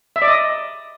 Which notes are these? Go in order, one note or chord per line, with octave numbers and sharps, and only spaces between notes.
E5
D5
D#5